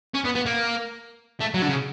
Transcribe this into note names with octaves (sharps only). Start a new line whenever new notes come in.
C#4
B3
B3
A#3
A3
F#3
D3
C#3